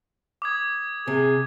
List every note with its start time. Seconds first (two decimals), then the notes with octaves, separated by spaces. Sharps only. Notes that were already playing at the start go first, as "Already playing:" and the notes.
0.42 D6 D#6 G#6
1.07 C3 G#4